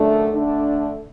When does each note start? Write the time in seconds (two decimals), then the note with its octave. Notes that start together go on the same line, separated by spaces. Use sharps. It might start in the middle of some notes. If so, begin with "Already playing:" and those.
Already playing: F#2 D3 A3 D4
0.32 D3 A3 D4